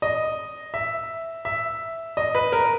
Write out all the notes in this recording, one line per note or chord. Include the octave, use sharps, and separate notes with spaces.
D#5
E5
E5
D#5
B4
A#4